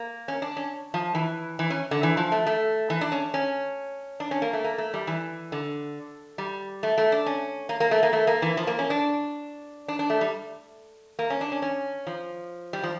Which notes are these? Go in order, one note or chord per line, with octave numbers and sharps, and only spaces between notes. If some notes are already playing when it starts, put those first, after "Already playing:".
Already playing: A#3
C#4
D4
C#4
F3
E3
E3
C#4
D3
E3
F3
A3
A3
E3
D4
C#4
C#4
D4
C#4
A#3
A3
A#3
A3
G3
E3
D3
G3
A3
A3
D4
C#4
A#3
A#3
A3
A#3
A3
A#3
E3
F3
A#3
C#4
D4
D4
D4
A3
G3
A#3
C#4
D4
C#4
C#4
F3
G3
F3